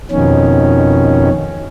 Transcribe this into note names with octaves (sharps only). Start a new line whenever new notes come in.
F2 B2 D#3 C#4